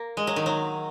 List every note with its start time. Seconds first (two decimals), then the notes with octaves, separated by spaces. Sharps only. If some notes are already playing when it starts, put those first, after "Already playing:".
Already playing: A#3
0.17 G#3
0.27 F#3
0.36 D#3
0.46 F#3